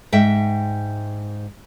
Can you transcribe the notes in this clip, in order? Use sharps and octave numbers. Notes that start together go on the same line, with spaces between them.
G#2 E5 G5